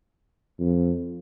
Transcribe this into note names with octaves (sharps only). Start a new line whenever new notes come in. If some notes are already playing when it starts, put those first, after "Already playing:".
F2